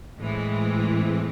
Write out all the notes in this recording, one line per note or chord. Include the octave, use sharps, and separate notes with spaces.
A2 E3 G#3 C4